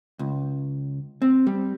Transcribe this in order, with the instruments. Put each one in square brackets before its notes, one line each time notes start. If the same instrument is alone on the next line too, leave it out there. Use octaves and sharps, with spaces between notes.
[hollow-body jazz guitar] C#2
C4
G3